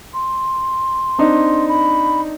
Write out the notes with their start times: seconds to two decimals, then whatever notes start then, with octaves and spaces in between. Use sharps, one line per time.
0.14 C6
1.18 C4 D4 D#4
1.68 B5